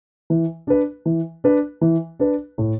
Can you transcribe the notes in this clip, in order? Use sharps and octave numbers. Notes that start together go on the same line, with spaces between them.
E3
D4 B4
E3
D4 B4
E3
D4 B4
A2